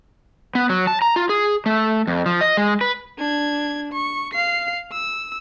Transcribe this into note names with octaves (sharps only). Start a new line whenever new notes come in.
B3
F#3
A5
A#5
F4
G#4
A3
F2
F3
D#5
G#3
B4
D4 G#6
C#6
F5 C7
E6